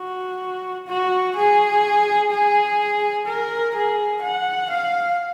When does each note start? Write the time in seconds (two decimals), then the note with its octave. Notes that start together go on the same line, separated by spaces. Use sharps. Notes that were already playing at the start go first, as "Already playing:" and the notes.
Already playing: F#4
0.87 F#4
1.35 G#4
2.30 G#4
3.26 A#4
3.75 G#4
4.21 F#5
4.70 F5